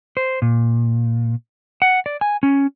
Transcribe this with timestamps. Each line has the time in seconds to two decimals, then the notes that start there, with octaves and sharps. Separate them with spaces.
0.17 C5
0.42 A#2
1.82 F#5
2.06 D5
2.21 G#5
2.43 C#4